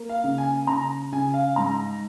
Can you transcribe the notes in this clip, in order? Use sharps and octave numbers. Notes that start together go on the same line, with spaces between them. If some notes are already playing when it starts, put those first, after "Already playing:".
Already playing: A#3
F5
C#3
G#5
C#3 A#5
C#3 G#5
F5
G#2 A#5